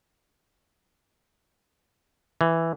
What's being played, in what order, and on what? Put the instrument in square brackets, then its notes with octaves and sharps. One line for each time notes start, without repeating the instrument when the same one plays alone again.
[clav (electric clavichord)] E3